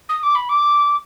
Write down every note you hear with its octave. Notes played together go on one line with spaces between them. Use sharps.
D#6
D6
B5
D6